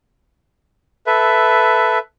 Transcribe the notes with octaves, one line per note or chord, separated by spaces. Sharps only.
A4 B4 E5